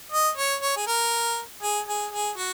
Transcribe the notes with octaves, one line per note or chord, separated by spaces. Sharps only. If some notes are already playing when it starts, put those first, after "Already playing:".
D#5
C#5
C#5
G#4
A#4
G#4
G#4
G#4
F#4